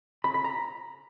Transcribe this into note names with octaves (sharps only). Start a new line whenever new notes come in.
B5
B5
A#5